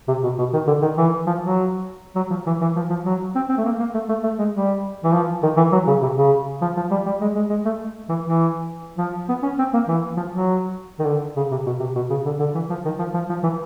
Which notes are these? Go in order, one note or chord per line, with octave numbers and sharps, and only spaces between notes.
C3
B2
B2
D#3
D3
D#3
E3
F3
F#3
F#3
F3
E3
E3
F3
F3
F#3
C4
C4
A3
A#3
A#3
A3
A3
A3
G#3
G3
E3
F3
D#3
E3
F#3
C#3
C3
C#3
F3
F3
G3
G3
G#3
G#3
G#3
A3
E3
E3
F3
B3
C#4
C4
A#3
E3
F3
F#3
D#3
D3
C#3
C3
B2
C3
B2
C#3
D3
D3
E3
F3
D#3
F3
F3
F3
E3